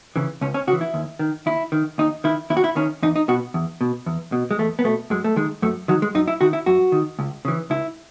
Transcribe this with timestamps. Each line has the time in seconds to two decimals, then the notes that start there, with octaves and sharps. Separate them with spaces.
0.16 C#3 E3
0.41 C#2 C#4
0.54 C#4
0.67 C#3 F#4
0.73 E3
0.81 E4
0.94 D#2
1.19 D#3
1.46 D#2 E4
1.72 D#3
1.98 D#2 D#4
2.24 D#3 E4
2.50 D#2 E4
2.57 F#4
2.64 E4
2.76 D#3 C#4
3.03 E2 D#4
3.16 D#4
3.28 B2 F#4
3.54 E2
3.81 B2
4.06 E2
4.32 B2
4.51 G#3
4.59 E2 A3
4.79 B3
4.84 B2 A3
5.10 F#2 G#3
5.24 A3
5.36 D#3 G#3
5.62 F#2 A3
5.88 D#3 F#3
6.02 G#3
6.15 F#2 D#4
6.28 E4
6.41 D#3 F#4
6.53 E4
6.66 F#2 F#4
6.92 D#3
7.19 C#2
7.45 C#3 E3
7.70 C#2 E4